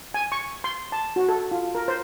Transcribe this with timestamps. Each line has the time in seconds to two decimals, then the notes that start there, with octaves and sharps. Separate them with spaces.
0.14 G#5
0.32 C#6
0.64 C6
0.92 A5
1.16 F#4
1.29 A4
1.51 F4
1.75 A#4
1.88 C5